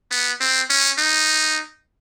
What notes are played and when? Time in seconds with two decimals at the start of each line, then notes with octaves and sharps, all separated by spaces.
0.11 B3
0.40 C4
0.70 C#4
0.98 D#4